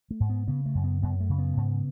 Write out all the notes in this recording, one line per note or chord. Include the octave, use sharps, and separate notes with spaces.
A3
G#2
B3
C#3 B3
A3
F#2
B3
F#2 B3
A3
C#3
B3
G#2